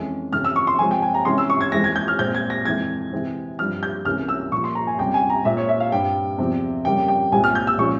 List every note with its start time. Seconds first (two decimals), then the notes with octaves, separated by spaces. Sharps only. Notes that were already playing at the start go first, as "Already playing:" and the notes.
Already playing: F2 E3 G#3 C#4
0.33 F2 C#3 E3 F6
0.44 E6
0.56 C#6
0.67 C6
0.79 C3 F3 G#3 C4 G#5
0.91 G5
1.02 G#5
1.14 A#5
1.25 C3 E3 G#3 C#4 C6
1.38 E6
1.50 C#6
1.61 G#6
1.72 F2 E3 G#3 C4 A#6
1.84 G#6
1.96 G6
2.08 F6
2.19 A#2 G#3 C4 G6
2.35 G#6
2.50 A#6
2.65 F2 E3 G#3 G#6
3.12 C3 E3 G#3 C4
3.59 G2 F3 C4 F6
3.83 G6
4.05 C#2 C3 E3 A#3 C#4 F6
4.29 E6
4.52 A#2 F3 A#3 C#6
4.64 C6
4.75 A#5
4.87 G#5
4.99 C#2 C3 G3 C#4 G5
5.14 G#5
5.30 A#5
5.45 A#2 G#3 C4 E5
5.57 C#5
5.69 E5
5.80 F5
5.92 G2 G3 C4 G5
6.38 E2 C3 F3 C4
6.85 F2 C#3 G3 A#3 G5
7.08 G5
7.32 C2 A#2 G#3 C4 G#5
7.44 F6
7.55 G6
7.67 E6
7.78 A#2 F3 G#3 C#4 C#6